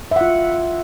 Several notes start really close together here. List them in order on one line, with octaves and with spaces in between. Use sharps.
E5 F#5 F4